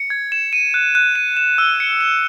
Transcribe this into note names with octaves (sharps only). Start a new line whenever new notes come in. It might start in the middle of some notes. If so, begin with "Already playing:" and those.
Already playing: C#7
G#6
E7
D#7
F#6
F#6
D#7
E7
E6
C#7
E7